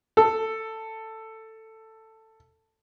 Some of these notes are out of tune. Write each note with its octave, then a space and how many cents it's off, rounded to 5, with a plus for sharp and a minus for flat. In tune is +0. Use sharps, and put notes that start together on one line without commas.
A4 +10